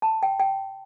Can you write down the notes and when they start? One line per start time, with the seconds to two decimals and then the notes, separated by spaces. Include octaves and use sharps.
0.02 A5
0.23 G5
0.40 G5